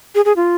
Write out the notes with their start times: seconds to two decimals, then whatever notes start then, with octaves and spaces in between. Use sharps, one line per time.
0.15 G#4
0.25 G#4
0.36 F4